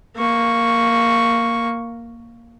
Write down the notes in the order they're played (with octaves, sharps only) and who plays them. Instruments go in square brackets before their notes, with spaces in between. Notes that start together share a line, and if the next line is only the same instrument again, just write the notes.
[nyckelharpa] A#3 C#6